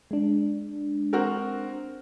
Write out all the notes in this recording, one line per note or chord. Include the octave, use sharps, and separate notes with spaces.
G#3 D4
C4 F#4 A#4